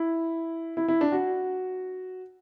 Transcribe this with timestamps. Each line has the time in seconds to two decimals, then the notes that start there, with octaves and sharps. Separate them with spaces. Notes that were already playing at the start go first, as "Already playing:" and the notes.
Already playing: E4
0.77 E4
0.88 E4
1.01 D4
1.12 F#4